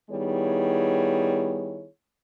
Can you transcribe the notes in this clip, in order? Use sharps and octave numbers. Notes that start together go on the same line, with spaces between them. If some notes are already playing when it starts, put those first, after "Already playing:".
D#3 G3 B3 E4 G#4 C#5